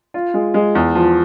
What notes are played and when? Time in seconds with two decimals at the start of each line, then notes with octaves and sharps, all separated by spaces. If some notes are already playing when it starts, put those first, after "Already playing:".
0.14 F4
0.34 G#3
0.54 G#3
0.75 E2
0.95 F3